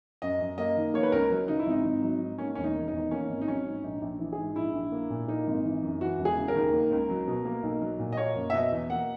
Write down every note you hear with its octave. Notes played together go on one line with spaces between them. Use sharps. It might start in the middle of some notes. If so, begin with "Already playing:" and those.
F#2 D#5
F#2
A#3 D#5
D#3
A#3 C#5
B4
C#2 A#4
F#3
C#3 D#4
E4
G#1 D#4
G#1
F#3
G#2
A#3 C#4
E1 C#4
D#4
D#3
E2 D#4
A#3 C#4
G#1
D#4
F#3 C#4
G#2
A#1 D#4
A#1
E3
G#4
G#2
A#1 E4
A#1
A#3
A#2
A#3 D#4
G#1
E3
F#2
E3 F#4
E1
G#4
C#3
A#4
D#2
A#3
C#2
F#3
B2
A#3
B1
F#3
A#2
D#5
A#3 C#5
F#1
E5
B2 D#5
E2
A#3 F#5